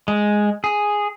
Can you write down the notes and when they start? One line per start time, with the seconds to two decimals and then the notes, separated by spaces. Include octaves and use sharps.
0.08 G#3
0.64 G#4